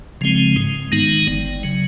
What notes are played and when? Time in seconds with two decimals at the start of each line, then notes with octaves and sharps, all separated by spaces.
0.21 C#3 F3 G#3 C4
0.56 G#2
0.92 D#3 G#3 B3 D#4
1.27 G1
1.63 C#3 F#3